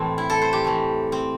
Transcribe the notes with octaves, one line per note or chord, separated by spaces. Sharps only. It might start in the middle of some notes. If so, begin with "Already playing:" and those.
Already playing: A2 C3 E3 A3 C4
E4
A4
C5
G4
C3 E3 A3
C4